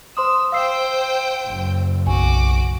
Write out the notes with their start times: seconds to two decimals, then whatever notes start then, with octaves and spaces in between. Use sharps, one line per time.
0.17 C5 C6 D#6 E6
0.52 C5 F5 G5 E6 C7
1.48 F#1
2.07 B1 F#4 G#5 D6